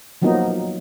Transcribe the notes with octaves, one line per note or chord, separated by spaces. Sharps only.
F3 F#3 A#3 B3 D#4